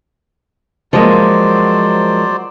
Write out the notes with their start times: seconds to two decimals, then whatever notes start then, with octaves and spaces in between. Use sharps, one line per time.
0.93 F3 F#3 G#3 A#3 C5 D5